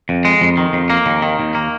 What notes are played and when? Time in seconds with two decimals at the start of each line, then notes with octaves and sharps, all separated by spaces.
0.09 F2
0.25 G#3
0.41 F2
0.57 D#3
0.73 F2
0.90 A#3
1.06 D#2
1.22 D#3
1.40 D#2
1.55 A#3